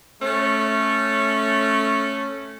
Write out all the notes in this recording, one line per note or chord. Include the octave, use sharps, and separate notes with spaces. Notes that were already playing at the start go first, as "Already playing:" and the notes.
A3 C#4